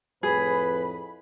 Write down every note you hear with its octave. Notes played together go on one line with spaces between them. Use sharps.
F2 A2 G#4 B4 B5